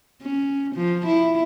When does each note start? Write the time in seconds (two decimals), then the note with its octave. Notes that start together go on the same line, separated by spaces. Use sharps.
0.22 C#4
0.75 F3
1.06 E4